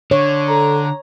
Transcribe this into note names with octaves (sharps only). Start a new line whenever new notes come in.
D3 C#5
A4 A#5